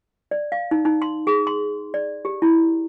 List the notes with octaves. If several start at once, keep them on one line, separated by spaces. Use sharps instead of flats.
D5
F5
D#4
D#4
C6
G#4
C6
D5
G4
E4